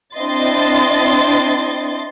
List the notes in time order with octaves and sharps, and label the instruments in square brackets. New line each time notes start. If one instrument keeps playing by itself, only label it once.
[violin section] C4 D4 E4 D#5 C6 A6